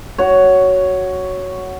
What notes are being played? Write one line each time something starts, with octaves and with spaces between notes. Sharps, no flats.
F#4 C#5